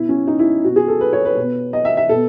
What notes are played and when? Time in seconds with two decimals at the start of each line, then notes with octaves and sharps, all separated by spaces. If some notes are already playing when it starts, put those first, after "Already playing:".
Already playing: B2 E4
0.09 C#4
0.27 D#4
0.39 E4
0.64 B2 F#4
0.76 G#4
0.88 A4
1.01 B4
1.13 C#5
1.25 B4
1.36 B2
1.73 D#5
1.85 E5
1.97 E5
2.09 B2 A4